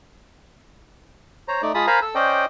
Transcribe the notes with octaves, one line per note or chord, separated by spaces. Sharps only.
C5 C#5 A#5
A3 D#4 D5
G#3 F4 G#4 A5 B5 D#6
A#4 C5 F5 G#5 A#5 B5
A4 E6
C#4 C5 D5 D#5 G5